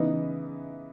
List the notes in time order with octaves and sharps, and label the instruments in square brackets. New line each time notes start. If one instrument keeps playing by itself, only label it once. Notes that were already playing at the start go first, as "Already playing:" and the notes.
Already playing: [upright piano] C#3 E3 B3 D#4